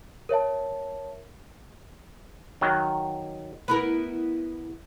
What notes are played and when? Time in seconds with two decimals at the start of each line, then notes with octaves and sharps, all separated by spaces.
0.29 A#4 C#5 E5 A5
2.61 D#3 F#3
3.68 B3 E4 A#4 B4